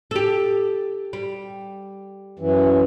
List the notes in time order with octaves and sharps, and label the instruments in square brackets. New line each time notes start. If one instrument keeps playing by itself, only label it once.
[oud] G4 A4
G3
[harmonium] F#2 E3